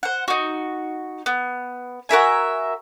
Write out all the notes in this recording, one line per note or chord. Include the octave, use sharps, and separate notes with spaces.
C5 F#5
D#4 F#4
B3
F#4 A#4 E5 G#5